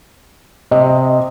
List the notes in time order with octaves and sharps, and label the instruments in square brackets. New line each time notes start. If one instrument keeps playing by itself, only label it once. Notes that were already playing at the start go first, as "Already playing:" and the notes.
[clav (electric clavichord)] C3 [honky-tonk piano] D#5